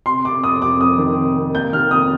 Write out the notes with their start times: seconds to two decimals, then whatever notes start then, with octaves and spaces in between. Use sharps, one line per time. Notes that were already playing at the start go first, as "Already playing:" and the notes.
0.06 C3 C6
0.25 C3 D6
0.44 F2 D#6
0.62 F2 D6
0.80 F2 D#6
0.99 D#3
1.17 C3
1.36 C3
1.54 A#3 G6
1.73 D#3 F6
1.91 F2 D#6